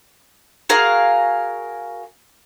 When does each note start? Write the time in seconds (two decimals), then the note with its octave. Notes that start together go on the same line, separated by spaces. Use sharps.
0.69 F#4 G#4 A#4 F5